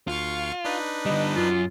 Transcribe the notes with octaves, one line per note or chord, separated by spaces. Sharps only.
D2 F4 F5 C#6
D4 D#4 B4
D3 G3 D#5
F#2 F4